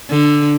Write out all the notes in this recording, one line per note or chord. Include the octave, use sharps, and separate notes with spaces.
D3